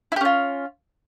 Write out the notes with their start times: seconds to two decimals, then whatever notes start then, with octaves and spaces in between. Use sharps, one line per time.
0.12 E4
0.16 G4
0.21 C#4
0.25 F4